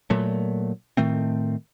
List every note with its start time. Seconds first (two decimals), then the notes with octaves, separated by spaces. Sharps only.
0.10 A#2 F#3 A3
0.97 A2 D#3 A3 C4